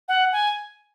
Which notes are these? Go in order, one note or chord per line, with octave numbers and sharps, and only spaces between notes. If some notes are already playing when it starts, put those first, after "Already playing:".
F#5
G#5